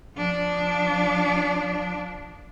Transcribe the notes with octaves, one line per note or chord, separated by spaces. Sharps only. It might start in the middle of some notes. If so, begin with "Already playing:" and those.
F3 D4